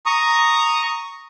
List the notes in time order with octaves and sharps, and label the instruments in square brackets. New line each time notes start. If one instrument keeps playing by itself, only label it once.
[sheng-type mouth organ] A#5 C#6 D#6